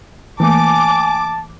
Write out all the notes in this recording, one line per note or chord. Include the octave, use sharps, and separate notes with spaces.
E3 A3 A#3 G#5 A5 D6